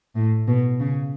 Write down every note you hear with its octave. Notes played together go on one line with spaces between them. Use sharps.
A2
B2
C#3